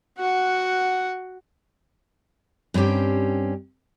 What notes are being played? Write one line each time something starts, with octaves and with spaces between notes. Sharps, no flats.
F#4 F#5
G2 C4 C#4 G4 G5